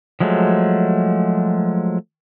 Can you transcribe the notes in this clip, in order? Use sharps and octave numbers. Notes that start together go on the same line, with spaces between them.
F3 F#3 G#3 A3